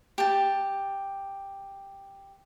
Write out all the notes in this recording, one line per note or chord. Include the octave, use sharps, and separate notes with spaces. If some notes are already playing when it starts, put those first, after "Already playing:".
G4 A5